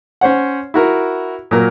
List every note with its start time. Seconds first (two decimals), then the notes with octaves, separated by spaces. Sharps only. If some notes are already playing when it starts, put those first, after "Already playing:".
0.21 C#4 C5 C#5 F#5
0.74 E4 F#4 A#4
1.51 A#2 F#3 A#4